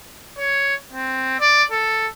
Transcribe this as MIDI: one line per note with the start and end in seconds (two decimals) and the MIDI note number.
0.38 0.74 73
0.93 1.35 60
1.40 1.63 74
1.71 2.08 69